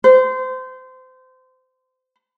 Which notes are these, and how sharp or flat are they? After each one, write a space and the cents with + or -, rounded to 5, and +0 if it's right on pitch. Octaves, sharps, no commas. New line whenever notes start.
C5 -25